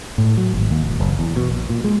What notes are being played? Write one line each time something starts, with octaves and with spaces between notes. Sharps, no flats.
A2
F#3
G#1
D#2
E1
F#1
E2
B2
A#1
A#2
G#3